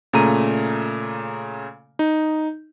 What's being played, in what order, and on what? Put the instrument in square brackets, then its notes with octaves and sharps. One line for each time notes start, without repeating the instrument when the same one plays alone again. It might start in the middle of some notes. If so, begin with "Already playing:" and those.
[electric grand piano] A#2 C#3 A3 A#5 D#7
D#4